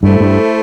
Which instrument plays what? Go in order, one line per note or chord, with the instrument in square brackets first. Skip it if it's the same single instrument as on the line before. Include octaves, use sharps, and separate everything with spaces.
[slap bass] G2 [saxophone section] A3 E4 A4 C5
[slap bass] G2